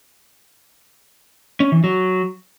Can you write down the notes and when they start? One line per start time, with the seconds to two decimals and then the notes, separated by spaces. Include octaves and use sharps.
1.60 C#4
1.72 E3
1.84 F#3